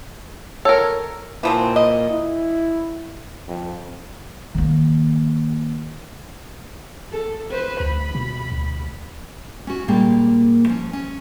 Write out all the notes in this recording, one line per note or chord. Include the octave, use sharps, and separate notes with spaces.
A4 A#4 C#5
A#2 E3 F3 C4
D#5
E4
F2
D#3 A#3
A4
B4 C5
D2 B5
B2
D2
C#4 F#4
A#2 G3 G#3 A#3 G5
F3 C#4
C#4